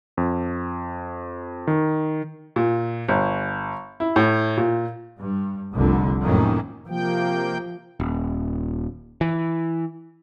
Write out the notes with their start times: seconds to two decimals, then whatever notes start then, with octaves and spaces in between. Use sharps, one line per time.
0.17 F2
1.67 D#3
2.56 A#2
3.09 G1
4.00 E4
4.16 A2
4.57 A#2
5.18 G2
5.74 F1 C2 F2 D3
6.21 F2 A2 D#3 F#3 A#3 C#4
6.88 C3 F3 A#3 G5
8.00 D#1
9.21 E3